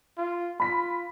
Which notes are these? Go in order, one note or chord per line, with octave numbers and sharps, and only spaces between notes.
F4
F4 B5 B6